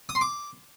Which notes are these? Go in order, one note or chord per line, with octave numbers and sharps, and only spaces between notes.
D#6
C6
D6